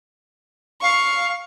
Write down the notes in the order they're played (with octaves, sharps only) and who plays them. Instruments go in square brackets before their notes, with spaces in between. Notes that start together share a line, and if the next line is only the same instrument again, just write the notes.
[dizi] F5 [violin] C#6